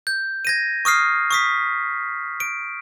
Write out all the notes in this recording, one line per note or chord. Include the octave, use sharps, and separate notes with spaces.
G6
G#6 A#6 D#7
C#6 D#6 F6 C7
C#6 D#6 B6
D7